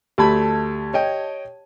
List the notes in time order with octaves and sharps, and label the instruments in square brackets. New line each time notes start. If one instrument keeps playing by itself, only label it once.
[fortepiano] D2 A3 B5 [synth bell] G4 A5 G#6
[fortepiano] C#5 D#5 G5